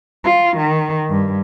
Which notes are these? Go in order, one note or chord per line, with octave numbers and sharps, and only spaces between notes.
F4
D#3
G2